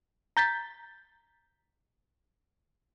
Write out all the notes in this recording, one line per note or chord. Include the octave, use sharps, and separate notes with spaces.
A#5 G6 A6 B6